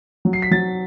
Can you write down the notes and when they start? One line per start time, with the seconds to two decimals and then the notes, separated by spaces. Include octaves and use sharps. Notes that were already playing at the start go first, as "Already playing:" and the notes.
0.25 F#3
0.33 C7
0.42 B6
0.51 F#3 A6